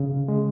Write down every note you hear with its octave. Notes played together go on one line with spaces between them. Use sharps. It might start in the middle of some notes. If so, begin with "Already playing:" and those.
Already playing: C#3
G#3